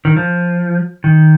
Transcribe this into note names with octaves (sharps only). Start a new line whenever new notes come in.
D#3
F3
D#3